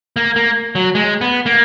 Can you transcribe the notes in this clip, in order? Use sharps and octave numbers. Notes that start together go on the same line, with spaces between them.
A#3
A#3
F#3
G#3
B3
A#3